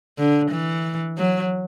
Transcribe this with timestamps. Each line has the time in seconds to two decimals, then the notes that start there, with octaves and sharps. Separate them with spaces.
0.18 D3
0.50 E3
1.18 F#3